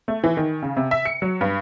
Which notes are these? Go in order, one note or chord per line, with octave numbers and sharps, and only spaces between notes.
A3
E3
D#3
C#3
C3
E5
C#7
F#3
G2